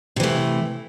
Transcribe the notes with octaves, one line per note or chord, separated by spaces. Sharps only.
C3 E3 A3